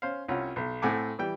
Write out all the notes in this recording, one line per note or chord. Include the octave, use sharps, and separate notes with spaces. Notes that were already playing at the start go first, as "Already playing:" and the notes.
C#4 C5 F5
C2 C#4 F4 F#5
B1
A2 C4 A4 F#5 G#5 D6
E3 G3 G5